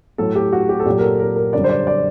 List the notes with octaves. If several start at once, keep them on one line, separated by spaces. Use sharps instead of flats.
A2 F#3 A4
G4
F#4
G4
A4
A#2 F#3 G4
A#4
A4
A#4
A#4
F#2 D3 G3 D5
C5
D5
D5